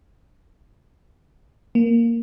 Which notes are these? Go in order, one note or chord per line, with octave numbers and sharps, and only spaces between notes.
A#3